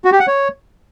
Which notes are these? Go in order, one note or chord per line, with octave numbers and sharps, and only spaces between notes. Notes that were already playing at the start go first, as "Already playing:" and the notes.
F#4
G4
F#5
C#5